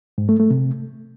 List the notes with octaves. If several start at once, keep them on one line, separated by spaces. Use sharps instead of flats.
G#2
A3
A3
C3